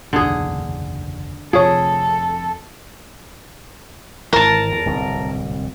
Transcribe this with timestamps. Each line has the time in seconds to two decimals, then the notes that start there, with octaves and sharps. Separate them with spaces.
0.13 F#1 B1 E2 D3 G#4
1.53 F1 F2 C3 F4 G#4 A4 C#5
4.33 G#1 E3 A#4 A5
4.72 E2
4.86 D1 C2 B2